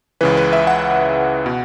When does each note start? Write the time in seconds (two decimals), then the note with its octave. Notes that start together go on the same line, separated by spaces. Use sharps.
0.21 C#2 C#3 E3 B4
0.37 B4
0.53 E5
0.67 F#5
1.46 B2